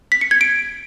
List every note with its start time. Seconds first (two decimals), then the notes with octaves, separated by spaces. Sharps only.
0.12 B6
0.21 C#7
0.31 G#6
0.41 D7